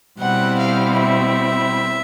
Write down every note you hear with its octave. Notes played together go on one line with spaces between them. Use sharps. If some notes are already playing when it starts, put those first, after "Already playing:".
B2 G3 C4 E4 F#5
F5
E5